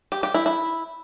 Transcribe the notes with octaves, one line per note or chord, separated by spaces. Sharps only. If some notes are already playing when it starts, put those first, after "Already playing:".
G4
G4
E4
E4